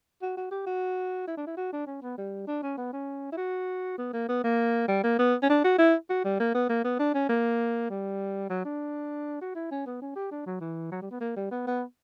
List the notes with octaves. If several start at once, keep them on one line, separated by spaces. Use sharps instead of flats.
F#4
F#4
G4
F#4
E4
D4
E4
F#4
D4
C#4
B3
G3
D4
C#4
B3
C#4
E4
F#4
B3
A#3
B3
A#3
G3
A#3
B3
C#4
D4
F#4
E4
F#4
G3
A#3
B3
A#3
B3
D4
C#4
A#3
G3
F#3
D4
F#4
E4
C#4
B3
C#4
G4
D4
F#3
E3
F#3
G3
B3
A#3
G3
B3
B3